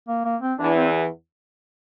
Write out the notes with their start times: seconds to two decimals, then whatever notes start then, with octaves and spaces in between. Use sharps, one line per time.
0.08 A#3
0.25 A#3
0.42 C4
0.59 E2 E3 D4
0.76 C4